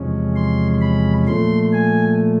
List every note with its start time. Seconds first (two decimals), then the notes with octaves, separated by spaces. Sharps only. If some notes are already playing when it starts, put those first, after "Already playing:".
Already playing: E2 C3 F3 G#3 C#4
0.36 C6
0.81 B5
1.27 A#2 F3 A3 C6
1.73 G#5